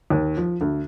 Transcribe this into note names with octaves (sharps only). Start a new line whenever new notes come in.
D#2
F3
D2